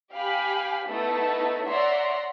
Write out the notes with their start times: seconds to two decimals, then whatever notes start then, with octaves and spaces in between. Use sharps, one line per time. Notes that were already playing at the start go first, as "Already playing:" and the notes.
0.14 G4 F5 G5 G#5 B5
0.87 A3 B3 D#4 E4 A4
1.67 C#5 D5 E5 F#5 A#5 C6